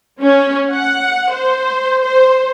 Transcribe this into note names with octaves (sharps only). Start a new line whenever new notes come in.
C#4
F#5
C5
C5